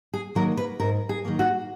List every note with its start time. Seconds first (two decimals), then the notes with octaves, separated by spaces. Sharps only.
0.14 G#4
0.35 D#3 F#3 A#3 A#4
0.57 B4
0.80 G#2 A#4
1.09 G#4
1.25 D#3 F#3 A#3
1.39 F#4